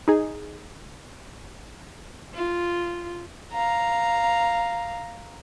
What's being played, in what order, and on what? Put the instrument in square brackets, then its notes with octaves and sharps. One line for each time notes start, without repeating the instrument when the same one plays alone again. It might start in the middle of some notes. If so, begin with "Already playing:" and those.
[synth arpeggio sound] D#4 G#4
[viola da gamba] F4
[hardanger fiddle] F5 A#5